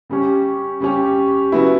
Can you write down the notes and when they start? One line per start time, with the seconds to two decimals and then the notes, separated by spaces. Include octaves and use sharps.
0.10 C#3 G3 C#4 G4
0.80 C#3 G3 C#4 G4
1.52 C#3 F#3 B3 E4